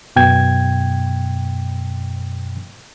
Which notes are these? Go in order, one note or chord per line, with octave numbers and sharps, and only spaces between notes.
F#2 B2 G5 G#6